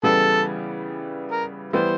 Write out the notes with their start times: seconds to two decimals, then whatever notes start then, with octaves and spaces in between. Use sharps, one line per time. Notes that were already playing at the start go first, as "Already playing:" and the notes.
0.03 C#3 E3 G3 B3 E4 A4
1.31 A#4
1.73 E3 G3 B3 E4 C5